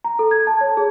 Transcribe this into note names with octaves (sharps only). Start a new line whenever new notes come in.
A#5
A4
G#6
A5
C#5
G#4